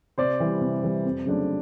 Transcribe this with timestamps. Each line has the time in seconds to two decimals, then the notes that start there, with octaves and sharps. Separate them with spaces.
0.18 C3 C5 D5
0.40 E3 G3
0.61 C3
0.83 E3 G3
1.05 F2
1.26 C#3 F#3 A3 D4